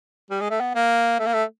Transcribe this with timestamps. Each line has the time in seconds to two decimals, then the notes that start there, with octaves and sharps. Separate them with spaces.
0.31 G3
0.41 G#3
0.50 A3
0.61 B3
0.75 A#3
1.19 A3
1.26 A#3
1.34 A3